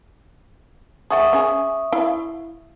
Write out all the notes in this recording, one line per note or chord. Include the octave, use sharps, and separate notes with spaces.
G#4 E5 F#5 G5 C#6 D#6
C#4 G#4
E4 F5